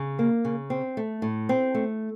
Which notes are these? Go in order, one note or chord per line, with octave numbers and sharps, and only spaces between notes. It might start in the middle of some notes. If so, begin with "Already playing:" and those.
Already playing: C#3
A#3
C#3
C4
A3
A2
C4
A3